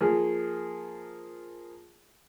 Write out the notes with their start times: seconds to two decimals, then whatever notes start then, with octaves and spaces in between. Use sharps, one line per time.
0.01 F3 A#3 G#4